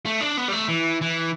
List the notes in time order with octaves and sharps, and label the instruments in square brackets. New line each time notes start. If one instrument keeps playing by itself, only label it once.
[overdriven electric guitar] A3
D4
B3
G3
A3
E3
E3